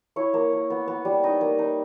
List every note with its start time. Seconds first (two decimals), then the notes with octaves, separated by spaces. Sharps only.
0.16 E4 C#5
0.34 A#3
0.52 A#3
0.70 B3
0.88 B3
1.05 G3
1.23 D#4 D#5
1.41 A#3
1.58 D#4